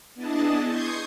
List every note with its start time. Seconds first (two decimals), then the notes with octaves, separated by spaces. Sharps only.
0.15 B3 D4 E4 G#4 D#5 A5
0.65 C6 C#6 D#6 G6 G#6 C7